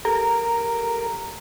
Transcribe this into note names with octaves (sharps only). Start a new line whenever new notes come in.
G4 A4 A#4 A#5